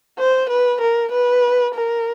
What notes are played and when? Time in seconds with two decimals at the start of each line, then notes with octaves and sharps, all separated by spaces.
0.19 C5
0.49 B4
0.81 A#4
1.11 B4
1.74 A#4